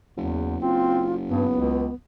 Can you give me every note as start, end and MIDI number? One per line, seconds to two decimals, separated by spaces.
0.17 1.98 30
0.17 0.56 40
0.62 1.05 60
0.62 1.15 65
1.29 1.46 43
1.29 1.94 59
1.52 1.88 37